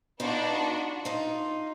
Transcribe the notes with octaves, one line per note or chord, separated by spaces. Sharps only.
B3 D4 D#4 F4 F#4
D#4 F4